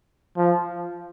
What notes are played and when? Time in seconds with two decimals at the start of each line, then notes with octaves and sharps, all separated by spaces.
0.37 F3